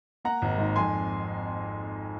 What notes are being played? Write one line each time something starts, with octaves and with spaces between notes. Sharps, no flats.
A#3 F#5 A#5
G#1
G#2
F2 G#5 C6